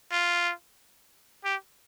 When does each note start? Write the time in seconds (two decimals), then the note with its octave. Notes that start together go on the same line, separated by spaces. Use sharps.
0.12 F4
1.45 G4